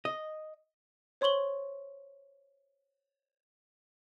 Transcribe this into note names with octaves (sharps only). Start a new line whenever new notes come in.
D#5
C5 C#5 C6 C#6 F#7 G7